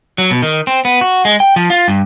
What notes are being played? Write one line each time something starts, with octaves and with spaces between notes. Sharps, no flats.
F#3
B2
D#3
C4
B3
F#4
G#3
G5
F3
F4
G2